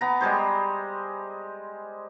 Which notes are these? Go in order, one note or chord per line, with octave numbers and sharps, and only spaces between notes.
B3 A#5
G3 G#3 G#4 C5